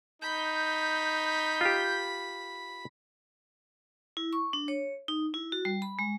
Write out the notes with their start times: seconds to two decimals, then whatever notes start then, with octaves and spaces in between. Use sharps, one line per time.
0.22 D#4 B5 G6
1.61 F4 G4
4.17 E4
4.33 C#6
4.53 D4
4.68 C#5
5.08 D#4
5.34 E4
5.52 F#4
5.65 G3
5.82 B5
5.99 G#3